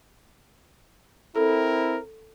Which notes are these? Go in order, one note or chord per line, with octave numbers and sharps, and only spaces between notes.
C4 E4 A4 A#4